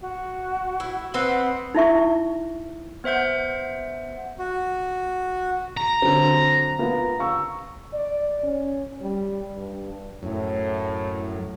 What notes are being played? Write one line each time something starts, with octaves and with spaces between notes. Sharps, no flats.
F#4
E4
C4 B4 D#5 F#5
D#4 E4 E5 C#6
B3 C5 E5 F#5 G6
F#4
A#5
D3 F#3 C4
A#3 B3 F4
F5 C#6 E6
D5
C#4
G3
G2
F#2 A2